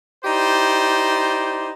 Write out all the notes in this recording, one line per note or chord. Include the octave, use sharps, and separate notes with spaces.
D#4 E4 G4 C5 D5